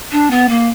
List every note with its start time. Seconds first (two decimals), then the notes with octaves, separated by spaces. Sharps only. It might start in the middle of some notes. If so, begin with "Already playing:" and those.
0.11 D4
0.30 B3
0.48 A#3